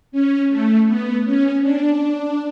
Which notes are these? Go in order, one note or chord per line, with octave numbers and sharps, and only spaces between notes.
C#4
A3
B3
C#4
D4